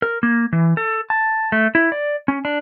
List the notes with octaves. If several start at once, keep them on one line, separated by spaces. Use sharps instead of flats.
A#4
A#3
E3
A4
A5
A3
E4
D5
C#4
D4